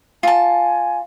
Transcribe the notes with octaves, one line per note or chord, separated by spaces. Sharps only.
F4 G#5 A5